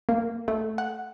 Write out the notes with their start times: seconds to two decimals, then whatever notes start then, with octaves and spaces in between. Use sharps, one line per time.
0.09 A#3
0.48 A3
0.78 F#5